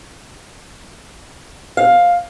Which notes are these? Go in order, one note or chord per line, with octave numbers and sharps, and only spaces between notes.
F5